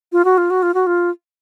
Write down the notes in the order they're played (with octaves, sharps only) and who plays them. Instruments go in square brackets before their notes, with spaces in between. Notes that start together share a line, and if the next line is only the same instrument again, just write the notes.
[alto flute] F4
F#4
F4
F#4
F4
F#4
F4